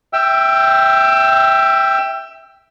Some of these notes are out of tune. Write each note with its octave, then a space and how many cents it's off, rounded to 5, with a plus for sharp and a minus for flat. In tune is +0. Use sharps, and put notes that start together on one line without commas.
E5 -5 G5 +5 E6 +30